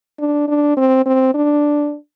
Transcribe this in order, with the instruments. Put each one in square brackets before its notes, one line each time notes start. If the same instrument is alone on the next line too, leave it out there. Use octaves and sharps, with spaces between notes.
[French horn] D4
D4
C4
C4
D4